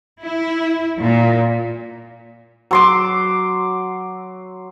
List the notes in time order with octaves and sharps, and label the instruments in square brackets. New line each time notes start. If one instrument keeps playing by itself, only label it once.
[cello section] E4
A#2
[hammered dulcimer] F#3 C6 D6